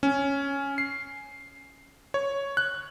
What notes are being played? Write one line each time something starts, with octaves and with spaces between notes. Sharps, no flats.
C#4
C7
C#5
F#6